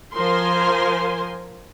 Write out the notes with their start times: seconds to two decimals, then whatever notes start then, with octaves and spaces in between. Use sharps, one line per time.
0.14 F3 A#4 C5 G#5 C6